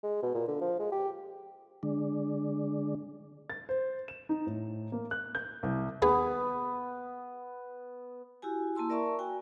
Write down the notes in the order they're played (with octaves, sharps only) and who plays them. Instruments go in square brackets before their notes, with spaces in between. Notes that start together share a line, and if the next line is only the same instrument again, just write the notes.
[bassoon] G#3
B2
A#2
D3
F3
G#3
G4
[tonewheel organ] D3 G#3 D4
[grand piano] A6
C5
E7
D#4
A2
A#3
F#6
G6
C2
[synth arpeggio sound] D#2 G#4 [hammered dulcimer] B3
[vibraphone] E4 F#4 G4 G#5
A#3 E4 A5 C6 E6
A#4 D5 E5 A5 A#5 C#6
F#4 G5 G#5